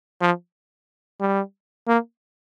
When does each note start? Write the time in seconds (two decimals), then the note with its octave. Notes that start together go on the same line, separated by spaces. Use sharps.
0.21 F3
1.20 G3
1.87 A#3